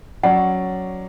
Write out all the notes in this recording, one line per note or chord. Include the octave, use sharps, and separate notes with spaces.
F#3 C#4 D5 F#5